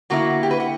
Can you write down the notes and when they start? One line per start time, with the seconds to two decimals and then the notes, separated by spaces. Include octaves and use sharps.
0.10 D3 A#3 E4 F#4
0.43 G4
0.51 B4
0.60 F#5